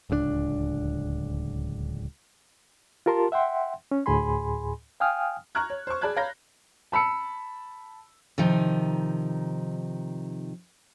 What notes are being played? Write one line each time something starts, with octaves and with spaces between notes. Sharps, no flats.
D1 C#2 B2 D4
F4 G4 A#4 A5 C6
E5 F#5 G5 C6
C#4
D2 A2 G#4 G#5 B5 C6
F5 G5 G#5 D#6 F6
A#5 C#6 F6 F#6 G#6
C#5
C5 C#6
G#4 D5 A5 B5 F#6 G#6
C#5 F5 A#5 B5 G6 A#6
A5 B5 E6 C#7
C3 D#3 F3 D#4